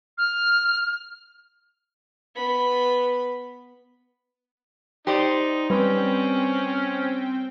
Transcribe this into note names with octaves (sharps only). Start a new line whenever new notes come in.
F6
B3 B5
D#4 G4 C5 D5
G3 C4 C#4 B4 G5